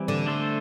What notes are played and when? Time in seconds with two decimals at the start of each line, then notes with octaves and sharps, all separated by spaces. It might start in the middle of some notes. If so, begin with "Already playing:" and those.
Already playing: E3 G3 C4
0.08 D3
0.26 A3 D4 A4 C5